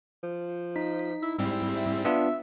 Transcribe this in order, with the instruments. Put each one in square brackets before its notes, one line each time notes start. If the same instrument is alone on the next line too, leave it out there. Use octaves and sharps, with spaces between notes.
[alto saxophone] F3
[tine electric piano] D#4 [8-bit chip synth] B6
[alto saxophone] E4
[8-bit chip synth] G#2 G3 C4 [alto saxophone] E4
[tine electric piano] E5
[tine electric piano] B3 D4 F4 [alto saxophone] E5